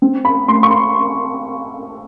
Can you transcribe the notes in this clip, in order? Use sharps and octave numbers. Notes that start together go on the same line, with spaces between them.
C4
B5
A3 C6
C#6
C6